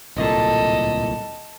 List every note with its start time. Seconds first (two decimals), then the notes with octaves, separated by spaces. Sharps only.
0.16 D1 C2 A#2 A4 D#5